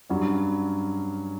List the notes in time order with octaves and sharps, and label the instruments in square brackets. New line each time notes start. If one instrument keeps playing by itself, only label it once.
[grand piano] G2 F#3 C#4